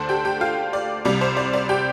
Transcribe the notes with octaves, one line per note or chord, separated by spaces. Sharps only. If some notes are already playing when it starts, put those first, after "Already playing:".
Already playing: D2 D3 A3 D4 A4 C5 A5 C6
G4 G5
G4 G5
F4 F5
D5
C2 C3 G3 D5
C5
D5
D5
G4 G5